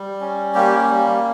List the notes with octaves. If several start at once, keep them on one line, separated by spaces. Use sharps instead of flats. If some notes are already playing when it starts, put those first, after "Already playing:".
Already playing: G3
C#4
A#3 G4
G3